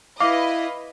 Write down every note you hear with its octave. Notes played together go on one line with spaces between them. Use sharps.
E4 B4 D#5 F5 D6